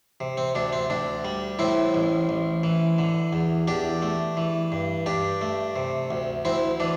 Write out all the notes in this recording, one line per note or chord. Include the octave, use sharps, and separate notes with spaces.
C3
C4
D2 D4
C4
D2 D4
G3
A2 C4 E4
A1
A1
E3
D3
E2
E2 D4 G4
A3
E3
G2
G2 D4 G4
A3
C3
D2
D2 C4 E4
E3 D4